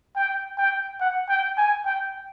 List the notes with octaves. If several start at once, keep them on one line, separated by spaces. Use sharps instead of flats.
G5
G5
F#5
G5
G#5
G5